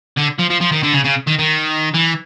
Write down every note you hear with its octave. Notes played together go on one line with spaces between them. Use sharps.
D3
F3
F3
F3
D#3
D3
C#3
C#3
D#3
D#3
E3